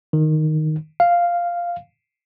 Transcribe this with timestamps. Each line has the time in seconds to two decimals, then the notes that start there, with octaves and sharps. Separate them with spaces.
0.13 D#3
1.00 F5